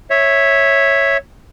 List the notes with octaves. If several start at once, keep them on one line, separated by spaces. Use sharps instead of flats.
C#5 E5